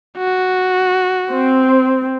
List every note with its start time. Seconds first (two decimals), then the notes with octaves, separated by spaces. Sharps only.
0.18 F#4
1.31 C4